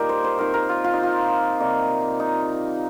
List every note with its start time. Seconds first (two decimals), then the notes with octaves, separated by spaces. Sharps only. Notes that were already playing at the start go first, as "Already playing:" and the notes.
Already playing: D#3 G3 A#3 D#4 F4 G4 A#4
0.09 C5
0.24 C5
0.39 D#3 C4 A#4
0.54 A#4
0.69 F4
0.84 F4
0.93 D#4
1.03 F4
1.60 C3 D#3 G3 A#3
2.20 D#4